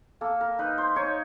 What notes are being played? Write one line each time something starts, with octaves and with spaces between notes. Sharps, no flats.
A#3 A4
A#4
D#4 B4
C5
D#4 C#5